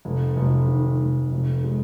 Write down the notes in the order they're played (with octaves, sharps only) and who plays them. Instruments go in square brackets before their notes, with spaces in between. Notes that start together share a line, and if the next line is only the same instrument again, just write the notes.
[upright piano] F1
F1
D#3
F1
F1
G#3